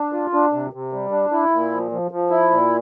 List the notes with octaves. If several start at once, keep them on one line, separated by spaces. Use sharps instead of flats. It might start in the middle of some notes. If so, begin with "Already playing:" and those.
Already playing: D4
F4
D4
C3
C3
G3
D4
E4
A#2
F3
F3
F3
E4
A#2